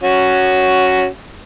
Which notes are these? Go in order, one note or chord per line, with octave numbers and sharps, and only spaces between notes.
C#4 F#4